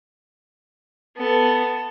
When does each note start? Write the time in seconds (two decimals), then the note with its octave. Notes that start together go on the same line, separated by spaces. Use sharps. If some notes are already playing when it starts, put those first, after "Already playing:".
1.17 B3 A4